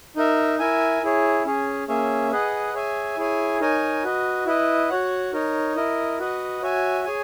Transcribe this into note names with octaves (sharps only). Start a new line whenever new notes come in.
D#4 A#4 E5
E4 A#4 E5 G#5
E4 G#4 C#5
C#4 G#4 C#5
A#3 C#4 G#4 C#5 E5
G#4 B4 D#5 F#5
G#4 C#5 E5 G#5
E4 G#4 C#5 G#5
D#4 A#4 C#5 G#5
F#4 B4 D#5
E4 B4 D#5
F#4 C#5 F#5
D#4 A#4 C#5
E4 A#4 D#5
F#4 B4 D#5 F#5
F#4 C#5 E5 G#5
G#4 C#5 G#5